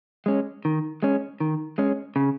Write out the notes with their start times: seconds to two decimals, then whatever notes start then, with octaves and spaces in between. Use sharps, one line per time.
0.26 G#3 C#4
0.65 D#3
1.03 G#3 C#4
1.40 D#3
1.78 G#3 C#4
2.16 C#3